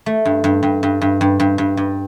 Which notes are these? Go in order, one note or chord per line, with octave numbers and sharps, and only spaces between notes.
A3
G2
G2
G2
G2
G2
G2
G2
G2
G2